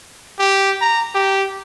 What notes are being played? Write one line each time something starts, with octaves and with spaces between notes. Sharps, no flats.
G4
A#5
G4